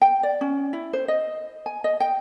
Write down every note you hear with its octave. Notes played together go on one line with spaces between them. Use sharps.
G5
D5
C#4
E4
C5
D#5
G#5
D#5
G5